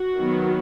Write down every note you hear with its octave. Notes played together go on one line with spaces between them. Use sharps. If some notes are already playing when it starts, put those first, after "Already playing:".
Already playing: F#4
D#3 F#3 B3